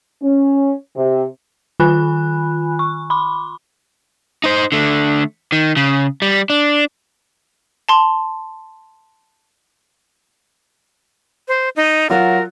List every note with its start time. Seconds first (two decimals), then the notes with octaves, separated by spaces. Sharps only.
0.22 C#4
0.95 C3
1.80 D#3 F4 G#5 B5 F#6
2.79 C#6
3.10 B5 C6 D6
4.44 D#4 C5
4.72 D3 A3
5.52 D#3
5.77 C#3
6.22 G3
6.50 D4
7.89 A5 C6
11.48 C5
11.76 D#4
12.10 F#3 F4 F#4 A#4